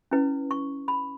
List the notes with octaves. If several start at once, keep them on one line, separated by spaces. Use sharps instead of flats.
C#4 E4 B4
C#6
B5